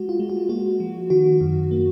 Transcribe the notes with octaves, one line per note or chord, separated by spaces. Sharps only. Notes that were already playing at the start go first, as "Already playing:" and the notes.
Already playing: G#3 F#4
F4
G#3
F#4
A#3 F#4
F3
D#3 F#4
F#2
A#3